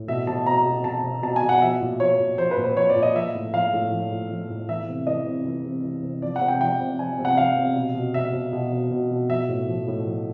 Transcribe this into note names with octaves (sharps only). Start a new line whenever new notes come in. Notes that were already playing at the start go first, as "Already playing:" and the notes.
Already playing: A2
B2 E5
B2 A5
B2 A#5
B2
B2 A5
B2
B2 A5
G#5
B2
F#5
F3 E5
A#2
F3 C#5
A#2
F3 C5
B4
A#2
C5
F3 C#5
D5
A#2
D#5
F3 E5
A2
F3 F5
A2
F3
A2
F3
A2
E3 E5
C3
E3 D#5
C3
E3
C3
E3
C3
F3 D5
F#5
C3
G5
F3 G5
C3
F3 G#5
C3
F#5
F3 F5
C3
B2
B2
B2 E5
B2
B2
B2
B2
B2
F3 E5
A2
F3
A2
F3